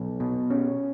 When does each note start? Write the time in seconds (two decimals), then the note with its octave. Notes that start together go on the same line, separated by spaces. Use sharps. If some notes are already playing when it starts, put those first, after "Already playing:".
Already playing: B1
0.20 B2
0.50 C#4